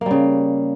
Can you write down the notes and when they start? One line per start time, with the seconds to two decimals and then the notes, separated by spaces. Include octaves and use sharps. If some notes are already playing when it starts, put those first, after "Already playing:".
0.01 A#3
0.06 G3
0.11 C#3